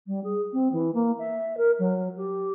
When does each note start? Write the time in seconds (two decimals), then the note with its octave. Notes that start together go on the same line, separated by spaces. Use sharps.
0.07 G3
0.23 G#4
0.53 C4
0.72 E3
0.94 A#3
1.18 E5
1.57 A#4
1.79 F#3
2.16 G4